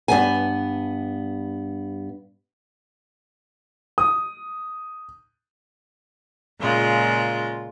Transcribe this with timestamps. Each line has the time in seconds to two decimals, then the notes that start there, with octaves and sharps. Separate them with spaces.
0.08 G2 B3 G#5
3.98 D#6
6.60 A#2 C#3 G#3 F4